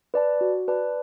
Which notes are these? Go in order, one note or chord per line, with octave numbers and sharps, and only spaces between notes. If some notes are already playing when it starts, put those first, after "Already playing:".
B4 D5 A5
F#4
B4 D5 A5